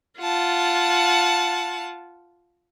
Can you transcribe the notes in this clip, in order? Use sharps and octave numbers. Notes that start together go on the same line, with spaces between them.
F4 F#5 A5